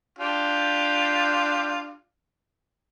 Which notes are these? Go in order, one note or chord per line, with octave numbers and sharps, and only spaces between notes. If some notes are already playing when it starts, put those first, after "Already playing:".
D4 F4 G4